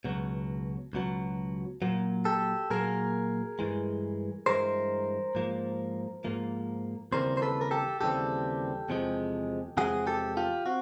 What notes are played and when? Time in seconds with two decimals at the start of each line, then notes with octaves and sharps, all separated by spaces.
0.05 C#2 B2 F#3
0.93 C#2 B2 F#3
1.82 A#2 F#3 A#3
2.25 G4 A4
2.70 A#2 F#3 A#3 G#4 A#4
3.59 G2 E3 G#3
4.46 G2 E3 G#3 A#4 C5
5.35 G#2 F3 A#3
6.24 G#2 F3 A#3
7.12 D#2 C#3 E3 G3 C4 A#4 C5
7.37 C5
7.42 A4 B4
7.61 A#4
7.71 G4 A4
8.00 D#2 C#3 E3 G3 C4 G4 A4
8.89 E2 C3 F3 G#3
9.77 E2 C3 F3 G#3 F#4 G#4
10.07 G4 A4
10.37 F4 G4
10.66 C4 F#4